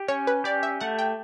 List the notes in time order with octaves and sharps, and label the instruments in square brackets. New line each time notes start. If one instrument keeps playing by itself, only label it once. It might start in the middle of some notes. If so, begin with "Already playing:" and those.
Already playing: [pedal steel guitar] G4
[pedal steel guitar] C#4 [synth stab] C#5
[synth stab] B4
[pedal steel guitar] G4 [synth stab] D5
[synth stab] E5
[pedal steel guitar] A3 [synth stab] F#5
[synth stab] G5